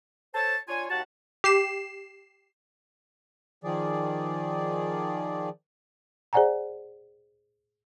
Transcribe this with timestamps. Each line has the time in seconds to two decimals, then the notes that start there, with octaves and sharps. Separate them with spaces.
0.35 A4 C5 C#5 A5
0.68 D4 F4 C#5 G#5
0.90 D#2 F#4 F#5 A5
1.44 G4 C7 E7
3.64 D#3 F3 G#4 D5
6.33 G#4 C5 D5 F#5 G#5 A#5